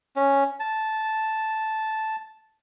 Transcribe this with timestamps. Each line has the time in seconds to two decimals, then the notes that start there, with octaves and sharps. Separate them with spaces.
0.16 C#4
0.60 A5